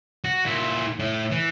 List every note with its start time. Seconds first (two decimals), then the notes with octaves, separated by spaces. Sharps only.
0.24 F#4
0.45 A#2 E4
0.99 A2
1.31 E3